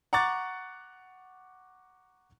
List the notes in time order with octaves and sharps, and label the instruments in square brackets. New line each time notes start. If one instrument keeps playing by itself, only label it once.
[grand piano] F#5 A#5 C#6 D6 F#6 A6